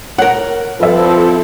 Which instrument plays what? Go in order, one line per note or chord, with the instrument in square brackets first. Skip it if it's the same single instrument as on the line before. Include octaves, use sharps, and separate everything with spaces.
[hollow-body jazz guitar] A#4 F#5 [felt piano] C#5
[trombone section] F3 [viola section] C4 E4 A4 [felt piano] B4 E5